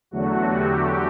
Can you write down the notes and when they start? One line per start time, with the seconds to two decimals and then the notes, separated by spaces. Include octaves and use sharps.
0.11 E2 D3 F#3 A3 F#4
0.49 G4